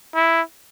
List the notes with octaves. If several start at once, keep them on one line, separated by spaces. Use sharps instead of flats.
E4